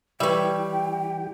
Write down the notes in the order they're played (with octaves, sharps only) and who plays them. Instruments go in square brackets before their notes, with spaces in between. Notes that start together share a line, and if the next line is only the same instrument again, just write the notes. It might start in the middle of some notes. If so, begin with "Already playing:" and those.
[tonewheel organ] E3 G4 [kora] G3 C#5 [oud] B4 E5 [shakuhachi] G5